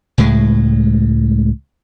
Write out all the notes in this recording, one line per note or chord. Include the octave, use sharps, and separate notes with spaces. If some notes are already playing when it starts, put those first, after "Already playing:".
C#2 A2 G#3